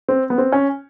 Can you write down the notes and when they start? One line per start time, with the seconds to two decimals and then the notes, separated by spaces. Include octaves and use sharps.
0.09 C4
0.30 B3
0.38 C4
0.52 C#4